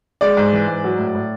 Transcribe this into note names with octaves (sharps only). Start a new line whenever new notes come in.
G#3 D5
G#2
E3
G#2
F#3
A2
A2